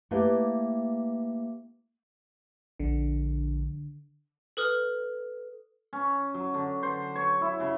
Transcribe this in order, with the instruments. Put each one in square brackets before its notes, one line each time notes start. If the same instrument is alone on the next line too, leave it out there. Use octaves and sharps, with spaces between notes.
[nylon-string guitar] A3 A#3 E4 G4 B4 F5
[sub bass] A#1 [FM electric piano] D3
[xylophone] A4 B4 D#6 F6
[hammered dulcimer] C#4
F#3
D3
C5
C#5
E4
C#3